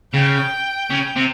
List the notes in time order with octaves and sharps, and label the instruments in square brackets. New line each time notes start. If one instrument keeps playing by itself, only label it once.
[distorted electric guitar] C#3 [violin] G5
[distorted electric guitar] C#3
C3